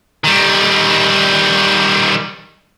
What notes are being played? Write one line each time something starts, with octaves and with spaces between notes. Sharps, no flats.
D#3 G3